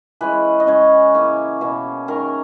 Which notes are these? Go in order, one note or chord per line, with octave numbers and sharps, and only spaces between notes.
E3 G#3 C#4 B4
D#5
C#3 G#3 C#4 C#5
E3 A#3 C#4
B2 A#3 C#4
D#3 G#3 C#4 A#4